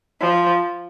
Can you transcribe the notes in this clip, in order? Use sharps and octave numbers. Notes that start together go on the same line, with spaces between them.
F3